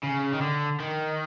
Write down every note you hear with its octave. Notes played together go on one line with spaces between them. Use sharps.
C#3
D#3
D3
D#3